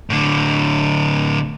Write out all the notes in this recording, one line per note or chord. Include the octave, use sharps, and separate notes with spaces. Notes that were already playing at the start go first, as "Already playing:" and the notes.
A2 D3